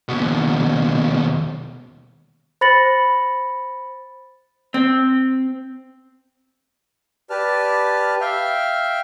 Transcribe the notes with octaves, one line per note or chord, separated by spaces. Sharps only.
D#2 B2
C5 B5 A6 A#6 C#7 F#7
C4
G4 B4 D5 A5 F6
E5 F5 G5 F6